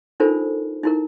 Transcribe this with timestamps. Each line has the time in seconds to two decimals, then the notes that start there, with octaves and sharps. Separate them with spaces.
0.20 D4 D#4 F4 A4 A#4 C5
0.83 D#4 E4 A#4